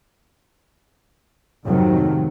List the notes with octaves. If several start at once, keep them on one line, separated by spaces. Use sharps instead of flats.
F2 G#2 C3 D#3 F#3 A3